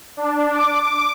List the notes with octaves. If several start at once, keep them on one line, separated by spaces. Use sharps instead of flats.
D4
D6